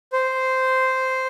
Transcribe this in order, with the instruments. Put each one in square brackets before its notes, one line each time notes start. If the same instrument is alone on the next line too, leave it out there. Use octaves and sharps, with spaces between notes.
[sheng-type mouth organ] C5